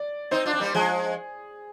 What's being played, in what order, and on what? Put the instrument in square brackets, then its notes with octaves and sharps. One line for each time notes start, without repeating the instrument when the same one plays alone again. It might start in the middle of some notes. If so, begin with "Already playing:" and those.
Already playing: [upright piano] D5
[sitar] C4 D#4 [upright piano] C5
[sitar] D4 F4
C4
G3 A#3
[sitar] F3 G#3 [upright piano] G#4